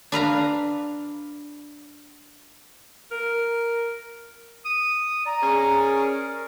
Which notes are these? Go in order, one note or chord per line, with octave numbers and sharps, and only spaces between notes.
D4 B4 F5 A#5
A#4
D#6
D5 A#5
C#4 G#4
A#4